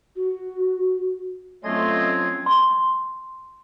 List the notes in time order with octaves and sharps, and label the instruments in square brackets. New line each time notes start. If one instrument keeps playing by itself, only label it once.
[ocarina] F#4
[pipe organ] F#3 C#4 G#6 [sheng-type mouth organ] A3 D#5 C6 [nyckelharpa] C4 F4
[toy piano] C6